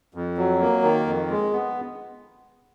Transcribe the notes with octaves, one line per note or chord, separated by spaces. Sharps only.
F2
F#3
A#3
D#3
F2
G#3
B3